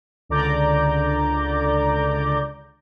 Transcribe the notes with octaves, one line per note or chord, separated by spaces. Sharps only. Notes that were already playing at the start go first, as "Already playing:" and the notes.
C#2 D3 D5 A#5 D6 G6